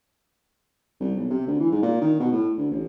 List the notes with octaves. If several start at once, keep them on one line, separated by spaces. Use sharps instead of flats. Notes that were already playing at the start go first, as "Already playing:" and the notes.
C2
B1
C3
D2
E3
G#2
A#2
D#3
B2
A2
D2
A1